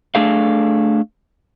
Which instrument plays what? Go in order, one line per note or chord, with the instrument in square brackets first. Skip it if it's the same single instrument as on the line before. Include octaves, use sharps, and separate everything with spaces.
[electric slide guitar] A3 D4 G#4 A4 F5